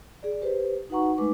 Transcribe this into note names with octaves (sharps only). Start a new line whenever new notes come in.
G#4 D5
G4 B4 C5
D#4 F#4 B4 F#5 A#5 C#6
G#3 A3 D#4 B4 D6